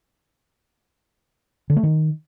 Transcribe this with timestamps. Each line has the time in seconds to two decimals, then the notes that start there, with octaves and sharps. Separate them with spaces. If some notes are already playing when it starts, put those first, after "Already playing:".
1.70 D3
1.76 A3
1.83 D#3